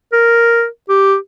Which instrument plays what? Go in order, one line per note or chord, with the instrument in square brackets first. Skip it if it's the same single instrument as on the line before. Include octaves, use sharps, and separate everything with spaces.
[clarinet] A#4
G4